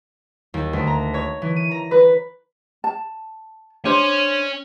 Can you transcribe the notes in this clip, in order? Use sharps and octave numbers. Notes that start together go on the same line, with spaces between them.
D#2
D2
A#5
C#5
E3
D#7
A#5
B4
A5
C#4 D4 C5